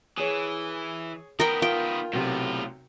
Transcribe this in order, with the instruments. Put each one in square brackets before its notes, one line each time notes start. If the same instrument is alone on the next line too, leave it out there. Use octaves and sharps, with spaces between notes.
[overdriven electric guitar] E3 [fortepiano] G#4 C#5
[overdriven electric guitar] D#3 B3 [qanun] A#4 G5
[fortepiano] F4 [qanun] G5
[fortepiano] B1 C3 [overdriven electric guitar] A2 F4